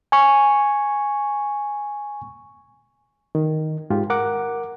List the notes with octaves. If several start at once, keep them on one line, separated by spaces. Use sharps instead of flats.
G#5 C#6
D#3
G#2 F4 G4
A#4 F#5 D6